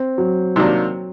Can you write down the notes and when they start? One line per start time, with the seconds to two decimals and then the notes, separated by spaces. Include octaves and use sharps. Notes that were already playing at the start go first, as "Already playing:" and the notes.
Already playing: C4
0.18 F#3
0.56 C3 D#3 F#3 A#3 D4